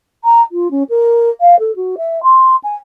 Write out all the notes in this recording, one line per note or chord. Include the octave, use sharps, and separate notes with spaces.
A#5
F4
C#4
A#4
F5
A4
F#4
E5
C6
G#5